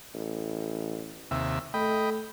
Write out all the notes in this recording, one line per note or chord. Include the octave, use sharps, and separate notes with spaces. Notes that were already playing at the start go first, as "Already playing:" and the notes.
A1
D#2 C3 E5
A3 D#5 G5 B5